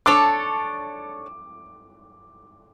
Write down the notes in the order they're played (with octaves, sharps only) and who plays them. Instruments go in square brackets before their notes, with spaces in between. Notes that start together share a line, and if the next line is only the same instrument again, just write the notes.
[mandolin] D4 A4 C#5 [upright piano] D6